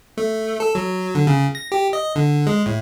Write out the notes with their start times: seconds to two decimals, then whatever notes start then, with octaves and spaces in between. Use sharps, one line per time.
0.17 A3
0.60 A4
0.75 F#3
1.15 D3
1.27 C#3
1.55 A#6
1.72 G4
1.93 D#5
2.15 D3
2.47 G#3
2.66 A2